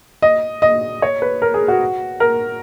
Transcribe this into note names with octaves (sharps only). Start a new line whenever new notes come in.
D#5
D#5
C#5
B4
A#4
G#4
F#4
A#4